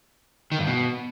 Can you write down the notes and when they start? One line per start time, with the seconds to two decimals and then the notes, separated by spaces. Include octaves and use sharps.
0.52 D#3
0.59 G2
0.66 B2